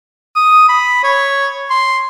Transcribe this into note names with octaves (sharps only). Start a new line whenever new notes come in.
D#6
B5
C#5
C6